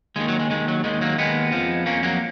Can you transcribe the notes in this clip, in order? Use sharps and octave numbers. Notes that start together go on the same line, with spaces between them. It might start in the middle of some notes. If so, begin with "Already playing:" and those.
D#2 D#3 G#3
F#3
G#3
D#2 D#3 G#3
F#3
D#2 D#3 G#3
F#3 A#3
D#2 D#3 G#3 B3
F2 F3
F2 F3 A#3 C#4
F#3 A#3